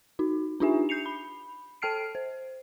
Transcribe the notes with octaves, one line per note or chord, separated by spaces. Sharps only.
D#4 F#4
D4 D#4 F4 G4 E5 G#5
G6 C7 C#7 F7
B5
A4 G5 A5 F6 C7 D7
C5